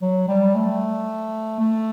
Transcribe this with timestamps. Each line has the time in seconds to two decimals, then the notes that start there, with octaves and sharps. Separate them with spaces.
0.02 F#3
0.28 G3
0.55 A3
1.60 A3